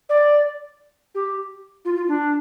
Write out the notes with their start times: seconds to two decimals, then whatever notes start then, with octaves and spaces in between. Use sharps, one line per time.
0.09 D5
1.15 G4
1.85 F4
1.97 F4
2.08 D4